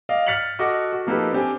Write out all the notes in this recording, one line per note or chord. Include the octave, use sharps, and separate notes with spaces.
D5 D#5 F5
F6 A6 B6 C#7 F7 F#7
F#4 A4 D#5 F#5 D6
F#4
F3 A#3 D#4 G4 A4 B4
C4 D4 G4 G5 G#5